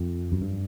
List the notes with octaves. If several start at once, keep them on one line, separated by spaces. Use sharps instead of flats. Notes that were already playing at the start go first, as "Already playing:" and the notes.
Already playing: F2
F#2
G2